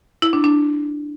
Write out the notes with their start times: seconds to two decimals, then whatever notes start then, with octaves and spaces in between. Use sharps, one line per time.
0.22 E4
0.33 D4
0.44 D4